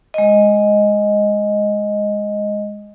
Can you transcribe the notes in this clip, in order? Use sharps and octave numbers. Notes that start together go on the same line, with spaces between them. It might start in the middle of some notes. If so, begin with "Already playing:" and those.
G#3 D#5